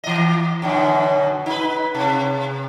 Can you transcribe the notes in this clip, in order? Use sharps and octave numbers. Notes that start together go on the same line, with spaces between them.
E3 D#5
F#2 B2 D3
D#4 B4
C3